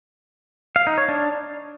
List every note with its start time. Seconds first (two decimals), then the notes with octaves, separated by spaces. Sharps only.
0.76 F5
0.87 D#4
0.98 C#5
1.09 D4